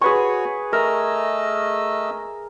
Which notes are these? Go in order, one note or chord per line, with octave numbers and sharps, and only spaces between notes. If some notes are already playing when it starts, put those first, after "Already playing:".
F#4 G#4 B4 C#5 C#6
A3 A#4 D#5 E6